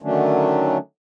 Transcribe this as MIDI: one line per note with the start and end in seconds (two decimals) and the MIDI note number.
0.02 0.78 50
0.02 0.78 51
0.02 0.78 54
0.02 0.78 57
0.02 0.78 61
0.02 0.78 62